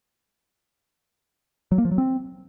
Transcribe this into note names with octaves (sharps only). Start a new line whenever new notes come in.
F#3
A#3
F3
F#3
C4